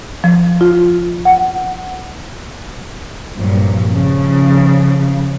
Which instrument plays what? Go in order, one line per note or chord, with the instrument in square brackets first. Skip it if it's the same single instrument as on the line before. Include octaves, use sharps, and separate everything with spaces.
[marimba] F3
F4
F#5
[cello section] G2 A#2 F3 F#3
C#3 F3